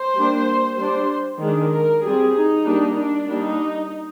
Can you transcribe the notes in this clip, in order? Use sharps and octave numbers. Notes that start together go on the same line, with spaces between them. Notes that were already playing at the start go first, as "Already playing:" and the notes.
Already playing: C5
G3 A#3 D4
G3 D4 C5
D#3 G#3 D4
A#4
G3 C4 G#4
D#4
G3 A#3 D4
D4
G3 A#3 D4 D#4